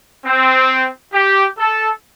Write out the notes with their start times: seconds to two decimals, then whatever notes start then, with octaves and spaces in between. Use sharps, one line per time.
0.24 C4
1.13 G4
1.58 A4